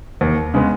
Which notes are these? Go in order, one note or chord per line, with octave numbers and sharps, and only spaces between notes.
D#2
C#3 G#3 B3